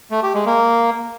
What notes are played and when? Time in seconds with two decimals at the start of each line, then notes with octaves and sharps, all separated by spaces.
0.11 A3
0.23 G4
0.34 G#3
0.46 A#3